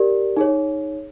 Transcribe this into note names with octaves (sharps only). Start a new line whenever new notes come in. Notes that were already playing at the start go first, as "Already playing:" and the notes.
Already playing: G4 A#4 D5
D#4 G#4 C#5